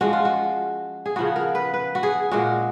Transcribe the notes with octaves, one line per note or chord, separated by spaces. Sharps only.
F3 G#3 C#4 F#4
F4
F#4
G#4
C#3 F3 B3 F#4
A#4
B4
B4
F#4
G#4
A#2 G#3 C#4 F#4